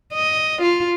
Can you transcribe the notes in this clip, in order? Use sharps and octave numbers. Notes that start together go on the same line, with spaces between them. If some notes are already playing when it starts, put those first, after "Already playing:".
D#5
F4